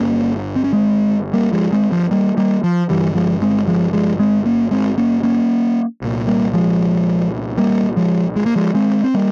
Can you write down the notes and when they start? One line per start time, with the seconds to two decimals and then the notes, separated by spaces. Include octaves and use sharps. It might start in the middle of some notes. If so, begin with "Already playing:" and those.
Already playing: G1 G2 A#3 C#4
0.56 C4
0.64 C#4
0.73 G#3 C4
1.33 G3 A#3
1.53 F3 G#3
1.72 G#3 C4
1.92 F3
2.11 G3 A#3
2.37 G3 A#3
2.64 F3
2.89 G1 G2 E3 G3
3.15 F3 G#3
3.42 G#3 C4
3.67 F3 G#3
3.93 F3 G#3
4.19 G#3 C4
4.46 A#3 C#4
4.71 G#3 C4
4.98 A#3 C#4
5.23 A#3 C#4
6.01 C2 A#2
6.27 G3 A#3
6.54 F3 G#3
7.58 G3 A#3
7.97 F3 G#3
8.36 G#3
8.46 A#3
8.56 F3 G#3
8.75 G#3 C4
9.04 C4
9.14 G3 A#3